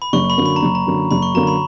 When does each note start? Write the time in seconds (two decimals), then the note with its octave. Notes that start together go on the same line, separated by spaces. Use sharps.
0.02 B5
0.13 F#1 C#6
0.30 B5
0.38 F#2 D3 A#3
0.46 B5
0.56 A#5
0.62 F#1
0.75 A#5
0.87 F#2 D3 A#3
1.11 F#1 B5
1.22 C#6
1.35 F#2 D3 A#3 A#5
1.47 B5